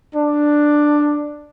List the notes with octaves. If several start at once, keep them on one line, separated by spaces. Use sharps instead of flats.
D4